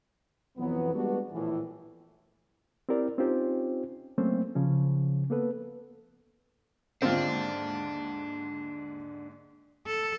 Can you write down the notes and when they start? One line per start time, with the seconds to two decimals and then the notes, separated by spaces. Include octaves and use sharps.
0.58 B1 F2 E3 F#3 B3
0.95 G3 G#3 B3 D4 F#4
1.32 A#1 A2 E3
2.89 C4 E4 G4 A#4 D5
3.18 C4 C#4 D#4 F4 G4 C5
4.18 F#3 A3 A#3 C4 C#4 C5
4.55 C#3 F3 C#4
5.30 A#3 B3 A4 B4
7.02 D#2 G#2 D3 C4 D4 F4
9.86 A4